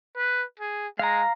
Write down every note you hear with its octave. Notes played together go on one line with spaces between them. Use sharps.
B4
G#4
G#3 F5 A#5